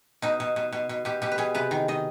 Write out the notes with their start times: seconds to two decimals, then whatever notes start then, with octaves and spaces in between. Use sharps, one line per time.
0.22 B2 D#4
0.40 B2
0.56 B2
0.72 B2
0.89 B2
1.05 B2 G4
1.22 B2 G4
1.32 B4
1.38 B2 G#4
1.54 C3 B4
1.71 D#3
1.88 D#3 D#5